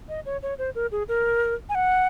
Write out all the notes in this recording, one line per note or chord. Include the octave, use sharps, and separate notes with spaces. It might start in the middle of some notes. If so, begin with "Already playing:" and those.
D#5
C#5
C#5
C5
A#4
G#4
A#4
G#5
F#5